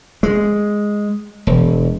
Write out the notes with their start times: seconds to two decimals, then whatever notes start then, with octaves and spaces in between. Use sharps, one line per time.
0.23 G#3
1.47 E1